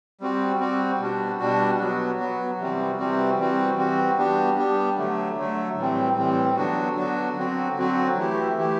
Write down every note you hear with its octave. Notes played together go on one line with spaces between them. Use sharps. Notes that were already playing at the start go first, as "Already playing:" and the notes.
G3 C4 F#4
G3 C4 F#4
B2 G3 D4 F#4
B2 G3 D4 F#4
F#3 B3 F#4
F#3 B3 F#4
C3 E3 G3 C4 F#4
C3 E3 G3 C4 F#4
E3 G3 C4 F#4
E3 G3 C4 F#4
G3 B3 D4 G4
G3 B3 D4 G4
D3 F#3 A3
D3 F#3 A3
A2 E3 G3 C4
A2 E3 G3 C4
D3 F#3 B3 D4 F#4
D3 F#3 B3 D4 F#4
D3 F#3 C4 F#4
D3 F#3 C4 F#4
E3 A3 E4 G4
E3 A3 E4 G4